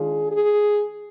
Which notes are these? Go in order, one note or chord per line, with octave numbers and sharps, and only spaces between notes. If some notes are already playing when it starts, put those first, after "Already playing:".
Already playing: D#3 G#3 D4 F4 G#4
G#4